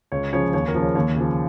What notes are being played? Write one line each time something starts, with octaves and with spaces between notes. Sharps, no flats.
C#2 C#5
C#3 F3 C#5
D#2 C#5
A#4
C#3 F3
C#5
D#2 C#5
C#3 F3